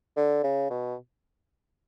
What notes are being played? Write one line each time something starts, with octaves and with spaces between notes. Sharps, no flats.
D3
C#3
B2